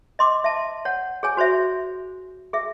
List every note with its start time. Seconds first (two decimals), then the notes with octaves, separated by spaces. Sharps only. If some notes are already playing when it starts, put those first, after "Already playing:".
0.19 D#5 C6 D6
0.44 E5 A5
0.85 C#5 F#5
1.23 G#4 C#5 G#5
1.37 F#4 C5 C#5 E5
2.53 G#4 E5